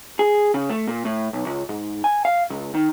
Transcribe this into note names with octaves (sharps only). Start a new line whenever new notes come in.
G#4
C#3
A3
A#2
A2
B1
C#2
G#2
G#5
F5
C#2
D#3